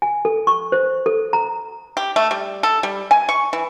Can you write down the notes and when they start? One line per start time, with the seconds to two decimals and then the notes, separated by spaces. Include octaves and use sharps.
0.02 G#5
0.25 A4
0.47 C#6
0.72 C5
1.06 A4
1.33 A#5
1.97 G4
2.16 A3
2.31 G3
2.63 A4
2.83 G3
3.11 G#5
3.29 C#6
3.53 E3